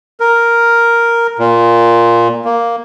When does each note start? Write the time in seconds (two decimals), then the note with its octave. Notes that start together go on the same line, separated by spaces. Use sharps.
0.20 A#4
1.39 A#2
2.45 A#3